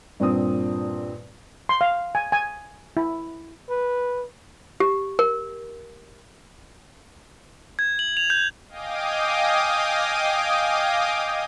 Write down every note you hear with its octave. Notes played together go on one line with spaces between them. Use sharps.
G2 A#2 C4 D#6
C6
F5
G#5
G#5
E4
B4
G4
A#4
G#6
F#7
F7
G6
D#5 F5 G5 G#5 D6 D#6